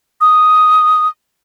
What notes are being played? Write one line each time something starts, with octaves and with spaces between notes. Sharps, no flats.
D#6